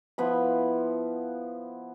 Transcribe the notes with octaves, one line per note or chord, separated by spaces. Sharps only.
F3 B3 E4 B5